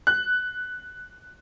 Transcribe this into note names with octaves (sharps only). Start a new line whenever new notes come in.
F#6